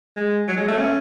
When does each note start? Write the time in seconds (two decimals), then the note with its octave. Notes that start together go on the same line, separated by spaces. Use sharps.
0.16 G#3
0.48 F#3
0.57 G#3
0.68 A3
0.79 C#4